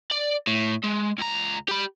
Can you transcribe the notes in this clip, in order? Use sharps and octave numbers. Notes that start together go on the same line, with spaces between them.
D5
A2
G#3
C#2 A#5
G4 B5